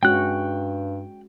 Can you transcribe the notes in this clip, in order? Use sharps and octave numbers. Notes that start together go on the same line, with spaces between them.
G2 G#3 C#4 F#4 G5 F#6